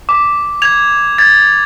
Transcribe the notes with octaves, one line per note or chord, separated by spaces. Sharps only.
D6
G#6 F7
G#6 A6